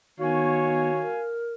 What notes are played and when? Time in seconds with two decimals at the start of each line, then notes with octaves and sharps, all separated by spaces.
0.20 D#3 B3 F#4 C#5 F5 G#5
1.01 A#4